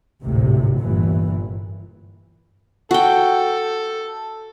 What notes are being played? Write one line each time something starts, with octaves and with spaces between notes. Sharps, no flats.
G#1 D2 A2 C3
G1 G2 A#2 E3
F#4 A4 G5